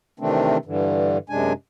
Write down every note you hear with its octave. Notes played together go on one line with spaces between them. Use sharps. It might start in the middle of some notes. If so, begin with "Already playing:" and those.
C3 D#3 E3 A3 C4 D4
G2 D3 E3
F#2 C3 G#3 D4 G#5